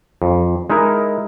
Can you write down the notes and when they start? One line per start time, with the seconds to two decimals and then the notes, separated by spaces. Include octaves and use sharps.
0.22 F2
0.70 G#3 D#4 E4 A#4